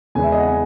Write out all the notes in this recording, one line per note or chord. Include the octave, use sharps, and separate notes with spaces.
E2 C#3 G#3 B3 G#5
E5
D#5
F#5
G#5